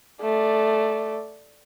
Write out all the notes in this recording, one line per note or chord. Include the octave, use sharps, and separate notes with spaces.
A3 D5